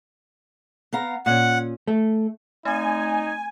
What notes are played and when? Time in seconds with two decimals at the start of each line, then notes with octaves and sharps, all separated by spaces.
0.93 B3 F5 A#5
1.26 A#2 C#4 F#5
1.88 A3
2.65 A3 C4 D#4 G#5